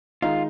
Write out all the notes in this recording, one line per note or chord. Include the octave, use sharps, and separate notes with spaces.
D#3 G#3 D#4 F4